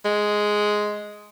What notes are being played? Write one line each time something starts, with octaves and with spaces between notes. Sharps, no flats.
G#3